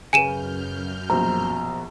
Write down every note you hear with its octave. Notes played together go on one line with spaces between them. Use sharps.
F#2 C#3 B4 G#5 F6 G6 D#7 E7
A#1 B2 C5 A#5